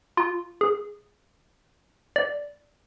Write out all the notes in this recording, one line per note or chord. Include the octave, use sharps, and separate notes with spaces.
F4
G#4
D5